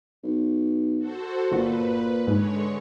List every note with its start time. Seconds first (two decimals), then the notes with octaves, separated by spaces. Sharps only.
0.23 B1
0.97 F#4 A4 C5
1.51 G1 A#2 F#4 B4
2.27 G#2 D3 G#3 C#5